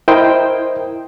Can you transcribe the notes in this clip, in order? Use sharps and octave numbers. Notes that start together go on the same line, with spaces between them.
E4 A#4 C5 D#5 G5